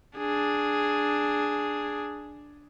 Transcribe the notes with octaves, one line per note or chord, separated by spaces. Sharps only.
D4 G#4